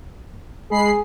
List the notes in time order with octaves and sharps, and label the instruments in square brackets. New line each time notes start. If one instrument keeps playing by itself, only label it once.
[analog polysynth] G#3 B5 C7 [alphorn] G#4